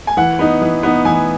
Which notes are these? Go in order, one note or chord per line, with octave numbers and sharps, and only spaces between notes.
G#5
E3 F#5
B3 D#4
E3
B3 D#4
E3 G#5